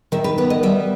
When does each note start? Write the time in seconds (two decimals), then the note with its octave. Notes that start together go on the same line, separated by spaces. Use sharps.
0.12 D#3 E5
0.24 B4
0.38 B3 B4
0.50 D#5
0.63 G3 E5